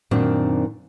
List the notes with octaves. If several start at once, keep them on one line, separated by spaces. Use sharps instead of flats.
F#2 A#2 D#3 C4 D4